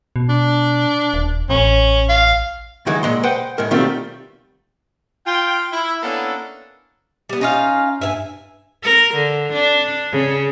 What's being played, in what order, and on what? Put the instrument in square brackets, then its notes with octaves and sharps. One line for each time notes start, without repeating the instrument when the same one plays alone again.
[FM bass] B2
[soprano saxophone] D4
[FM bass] D#1
[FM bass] A1 [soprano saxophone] C#4
[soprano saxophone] F5
[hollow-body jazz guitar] C#2 D#3 E3 F#3 G#3
A#2 G#3 C6
B4 C5 F#5 G5
A2 G#3 A#4
B2 D#3 G3 A3 C4 F4
[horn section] F4 G5
E4
A#3 B3 C#4 D4 E4 A4
[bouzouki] G3 B3
[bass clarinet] C#4 [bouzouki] D#4 F4 F5
[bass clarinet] G2 [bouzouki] E5 F5 G#5
[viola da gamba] A#4
D3
D4
C#3